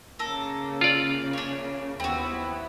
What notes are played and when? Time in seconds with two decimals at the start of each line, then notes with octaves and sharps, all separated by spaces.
0.19 C#3 A#3 A4 A#4
0.81 F4 D5
1.33 D4 C#5
2.00 D#2 B3 C4 E4 F#4